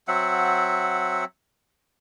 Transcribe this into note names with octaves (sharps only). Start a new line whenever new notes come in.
F#3 C4 E5 F#5